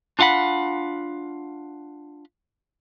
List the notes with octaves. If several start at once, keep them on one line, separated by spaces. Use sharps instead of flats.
D4 F4 F5 F#5 B5